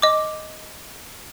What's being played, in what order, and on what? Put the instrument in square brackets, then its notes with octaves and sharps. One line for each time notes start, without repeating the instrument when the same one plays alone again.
[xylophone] D#5 D6